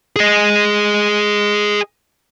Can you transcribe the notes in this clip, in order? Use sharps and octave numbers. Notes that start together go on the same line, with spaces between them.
G#4 D#5